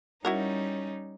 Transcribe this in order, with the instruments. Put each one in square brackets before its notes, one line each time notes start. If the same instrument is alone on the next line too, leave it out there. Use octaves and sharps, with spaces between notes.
[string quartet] G3 C#4 D#4 [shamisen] E4 F#4 A#4